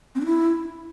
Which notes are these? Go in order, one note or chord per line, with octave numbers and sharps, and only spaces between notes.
C4
D4
E4